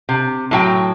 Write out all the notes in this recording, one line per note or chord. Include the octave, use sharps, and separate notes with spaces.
C3
A2 F#3 G5